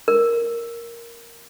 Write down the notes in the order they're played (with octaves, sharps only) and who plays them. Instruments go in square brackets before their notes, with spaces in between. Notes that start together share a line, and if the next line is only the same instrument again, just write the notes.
[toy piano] A#4